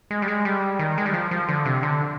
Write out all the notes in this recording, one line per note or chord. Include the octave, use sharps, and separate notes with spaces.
G#3
G3
G#3
G3
D#3
G#3
G3
F3
F3
D3
C3
D3